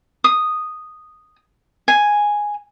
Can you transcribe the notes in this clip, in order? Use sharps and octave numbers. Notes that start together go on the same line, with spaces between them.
D#6
G#5